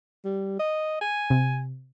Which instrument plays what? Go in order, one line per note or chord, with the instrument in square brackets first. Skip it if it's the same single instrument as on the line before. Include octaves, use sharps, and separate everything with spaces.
[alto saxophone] G3
D#5
G#5
[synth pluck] C3